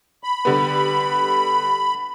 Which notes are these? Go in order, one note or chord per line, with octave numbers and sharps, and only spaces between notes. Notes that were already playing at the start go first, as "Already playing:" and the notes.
B5
D3 G3 B3